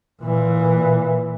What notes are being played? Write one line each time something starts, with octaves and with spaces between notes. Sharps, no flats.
A#2 E3